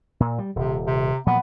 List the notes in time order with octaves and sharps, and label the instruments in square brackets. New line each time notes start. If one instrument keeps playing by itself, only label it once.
[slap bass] A#2
G3
[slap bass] D#1 [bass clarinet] C3
[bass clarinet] C3
[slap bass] A#2 F3 F#3 [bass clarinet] B3